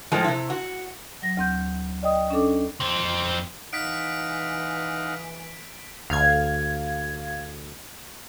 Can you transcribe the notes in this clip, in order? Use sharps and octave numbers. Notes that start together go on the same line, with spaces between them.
A2 F3 G#3 F4 A#5
C3 E4
F#4
F#3 A#6
D2 C4 G6
D5 D#5 G5 D#6
C#4 D4 A4 D6
F2 C4
E3 D#4 F5 F#5 B6 D7
D2 F5 G#6